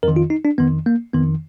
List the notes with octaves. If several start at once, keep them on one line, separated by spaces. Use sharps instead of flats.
F2 D#3 A#4
F4
D#4
D4
F2 D#3 B3
A#3
F2 D#3 B3